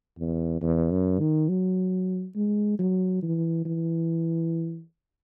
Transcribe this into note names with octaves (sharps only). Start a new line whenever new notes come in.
E2
E2
F#2
D#3
F#3
G#3
F#3
E3
E3